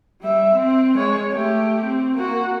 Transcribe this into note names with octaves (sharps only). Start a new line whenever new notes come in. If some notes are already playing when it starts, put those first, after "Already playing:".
G3 E5
C4
G#3 C#5
A3 G4
C4
A#3 F#4